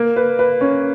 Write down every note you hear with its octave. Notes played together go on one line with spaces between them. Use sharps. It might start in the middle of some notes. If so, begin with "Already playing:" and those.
Already playing: A#3
B4
B4
C#4